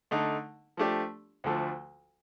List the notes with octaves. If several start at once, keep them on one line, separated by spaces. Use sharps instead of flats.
D3 A3 D#4
F3 A3 D4 G4 D5
D2 D3 F3 A3